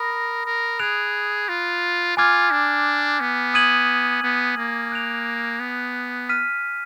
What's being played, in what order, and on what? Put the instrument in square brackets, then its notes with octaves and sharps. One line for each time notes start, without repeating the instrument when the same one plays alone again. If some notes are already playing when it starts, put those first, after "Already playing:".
Already playing: [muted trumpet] A#4 [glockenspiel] B5 D#6 A#6
[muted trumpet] A#4
[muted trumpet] G#4 [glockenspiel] F#6 D7 F7
[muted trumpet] F4
[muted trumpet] F4 [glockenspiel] G#5 D6 F6 G#6
[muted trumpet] D4
B3
[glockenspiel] D#6 G#6 D#7 F#7
[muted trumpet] B3
A#3
[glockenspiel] F#6 D7 F7
[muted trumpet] B3
[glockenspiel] F6 B6 D#7